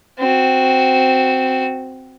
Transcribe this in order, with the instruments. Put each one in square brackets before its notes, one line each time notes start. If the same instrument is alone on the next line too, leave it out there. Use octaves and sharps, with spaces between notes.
[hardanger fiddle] C4 F#4